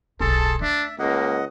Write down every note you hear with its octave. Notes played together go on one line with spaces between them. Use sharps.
D1 B1 G#4 A4 A5 C6
A3 D4 E5
C#2 A#3 D#5 F#5